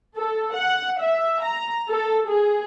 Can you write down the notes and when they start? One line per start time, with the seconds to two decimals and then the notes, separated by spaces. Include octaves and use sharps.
0.17 A4
0.55 F#5
1.01 E5
1.43 A#5
1.90 A4
2.28 G#4